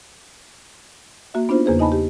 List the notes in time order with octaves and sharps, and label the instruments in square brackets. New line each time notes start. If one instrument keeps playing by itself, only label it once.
[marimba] A#3 F#4 E5
B3 D4 D#4 F4 C5
E2 C#3 A#3 G#4 B4 C5
D#4 D#5 G#5 A5 B5
G4